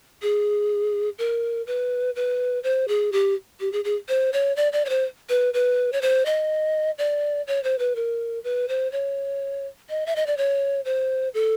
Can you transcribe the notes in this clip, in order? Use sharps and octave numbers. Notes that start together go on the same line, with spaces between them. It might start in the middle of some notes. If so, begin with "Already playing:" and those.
G#4
A#4
B4
B4
C5
G#4
G4
G4
G#4
G#4
C5
C#5
D5
D5
C#5
C5
B4
B4
C#5
C5
D#5
D5
C#5
C5
B4
A#4
B4
C5
C#5
D#5
E5
D#5
D5
C#5
C5
A4